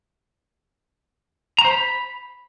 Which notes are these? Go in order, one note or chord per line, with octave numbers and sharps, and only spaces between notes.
A#5
C5
B5